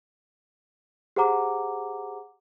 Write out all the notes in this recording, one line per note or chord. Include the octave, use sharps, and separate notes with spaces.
G4 G#4 C5 F#5 A#5 D6